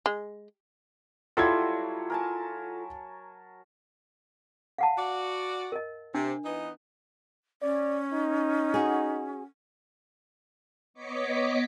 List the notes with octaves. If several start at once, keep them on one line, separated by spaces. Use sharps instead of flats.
G#3
F#3 G3 E4 F4 A4 C6 G#6
A#4 G#5 A5
F5 F#5 A5
F#4 D5
A#4 D#5
C3 D4
E3 B3 D#4
C#4 D5
D#4
F#4 G#4
B3 C#5 D#5 D6 B6 C#7